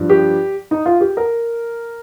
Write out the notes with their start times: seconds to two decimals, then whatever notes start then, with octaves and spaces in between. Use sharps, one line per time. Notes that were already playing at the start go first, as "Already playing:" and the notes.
Already playing: G2 F3
0.09 G4
0.71 D#4
0.86 F4
1.01 G4
1.17 A#4